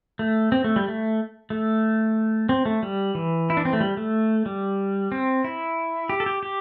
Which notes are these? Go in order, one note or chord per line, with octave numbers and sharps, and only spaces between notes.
A3
C4
A3
G3
A3
A3
C4
A3
G3
E3
E4
D4
C4
A3
G3
A3
G3
C4
E4
G4
A4
G4
G4